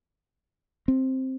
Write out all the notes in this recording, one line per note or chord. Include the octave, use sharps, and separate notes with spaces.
C4